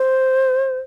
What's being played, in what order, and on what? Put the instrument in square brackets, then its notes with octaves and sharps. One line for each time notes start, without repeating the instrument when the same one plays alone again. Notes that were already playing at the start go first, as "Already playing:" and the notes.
Already playing: [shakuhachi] C5